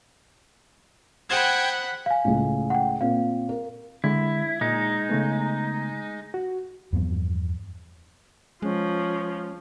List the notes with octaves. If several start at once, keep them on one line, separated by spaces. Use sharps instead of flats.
G#4 C5 F#5 G5 A5 B5 G#6
F5 G#5
C#2 A2
F#5 G5
A#2 C4 F5
A#4
D3 G#3 E4
A#2 G#3 D#4
C#3 A3 B3
F#4
E2 G2 F3 B3
F3 G#3 C#4